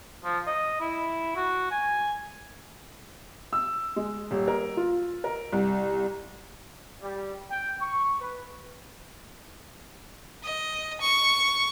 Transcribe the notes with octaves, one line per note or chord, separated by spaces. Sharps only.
F3
D#5
E4
F#4
G#5
E6
G#3
D#1
A#4
F4
A#4
C2
G3
G5
C#6
B4
D#5
C#6